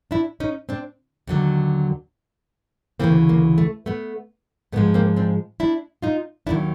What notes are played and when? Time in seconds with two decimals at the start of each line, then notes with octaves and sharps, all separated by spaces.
0.11 D4 E4
0.40 C#4 D#4
0.69 C4 D4
1.27 D#2 D3 F#3
2.99 D2 C#3 E3 A#3 C4
3.29 A#3
3.58 A3
3.86 A3 B3
4.72 G#2 F3 G#3 A3 B3
4.94 A#3 C4
5.16 C4 D4
5.60 D4 E4
6.02 D#4 F4
6.47 D#2 D#3 F#3 D4 E4